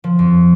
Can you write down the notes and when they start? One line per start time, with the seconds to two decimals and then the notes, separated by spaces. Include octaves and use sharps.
0.04 F3
0.19 F2